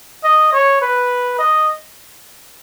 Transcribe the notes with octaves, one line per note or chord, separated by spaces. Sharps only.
D#5
C#5
B4
D#5